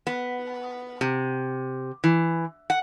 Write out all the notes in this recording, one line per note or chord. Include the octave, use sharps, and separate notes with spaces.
B3
C3
E3
F#5